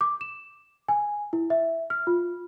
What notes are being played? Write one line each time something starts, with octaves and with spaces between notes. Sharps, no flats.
D6
E7
G#5
E4
E5
F6
F4